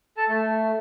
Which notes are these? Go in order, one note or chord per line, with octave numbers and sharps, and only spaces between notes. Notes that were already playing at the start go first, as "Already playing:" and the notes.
A4 A5
A3